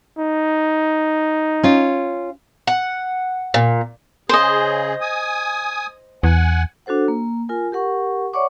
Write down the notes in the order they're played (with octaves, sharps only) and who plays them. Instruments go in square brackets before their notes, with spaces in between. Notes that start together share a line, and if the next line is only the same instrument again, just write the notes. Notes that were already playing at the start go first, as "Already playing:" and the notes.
[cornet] D#4
[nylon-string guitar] C#4 F4
[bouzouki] F#5
A#2
[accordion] C#3 G#4 [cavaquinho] C5 D#5
[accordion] G#5 D#6
[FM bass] E2 [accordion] F#5 G#5
[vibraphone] D4 F#4 A4 C5 F#5
A#3
F4 A#4 G#5
G4 A#4 F#5 C#6
C#5 D5 E5 F#5 C#6 D6